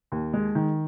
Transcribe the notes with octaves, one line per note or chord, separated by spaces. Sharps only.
D#2
G#3
D#3